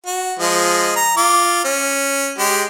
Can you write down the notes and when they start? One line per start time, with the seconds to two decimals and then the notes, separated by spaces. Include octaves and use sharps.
0.06 F#4
0.39 F3 G#3 D#5
0.96 A#5
1.17 F4 D6
1.65 C#4
2.39 G#3 G4